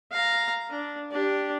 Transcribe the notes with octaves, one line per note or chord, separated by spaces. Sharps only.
F5 A#5
D4
D4 G4